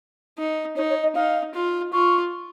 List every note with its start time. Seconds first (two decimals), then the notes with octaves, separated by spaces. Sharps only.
0.38 D#4
0.76 D#4 C#5
0.90 C#5
1.03 D#5
1.15 D#4 F5
1.54 F4
1.93 F4 C#6